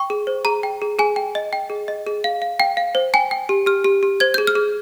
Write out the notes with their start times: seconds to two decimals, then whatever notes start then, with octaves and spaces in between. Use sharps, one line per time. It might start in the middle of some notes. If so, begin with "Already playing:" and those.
Already playing: G5 C#6
0.10 G#4
0.27 C5
0.45 G#4 A#5
0.63 G5
0.82 G#4
0.99 G#4 G#5
1.16 G5
1.35 D#5
1.53 G5
1.70 G#4
1.88 D#5
2.07 G#4
2.24 F5
2.42 F5
2.60 F5 G5
2.77 F5
2.95 C5
3.14 G5 G#5
3.31 G5
3.49 G4
3.66 G4 F6
3.84 G4
4.03 G4
4.20 C5 G#6
4.34 G#4 G6
4.47 F6
4.55 G#4